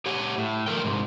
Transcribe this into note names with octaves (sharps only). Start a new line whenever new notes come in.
G4 C#5 F#5 G#5
A2
F3 A4 A#4 G5
G#2 C3